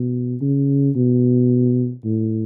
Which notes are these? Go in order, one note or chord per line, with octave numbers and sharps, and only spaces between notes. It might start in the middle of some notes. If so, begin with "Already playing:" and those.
Already playing: B2
C#3
B2
A2